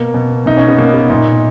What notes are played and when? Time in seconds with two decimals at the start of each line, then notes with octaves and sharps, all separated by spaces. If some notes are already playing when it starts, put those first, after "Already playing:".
Already playing: B2 A#3
0.14 B2
0.46 B2 D#4
0.57 C#4
0.68 B3
0.78 B2 A#3
0.94 B3
1.10 A#2 D#4